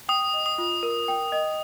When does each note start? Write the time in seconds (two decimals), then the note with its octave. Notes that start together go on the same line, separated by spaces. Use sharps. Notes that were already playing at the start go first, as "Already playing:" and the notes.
0.09 G5 D#6
0.34 D#5
0.46 D#6
0.58 F4
0.83 A#4
1.08 G5
1.32 D#5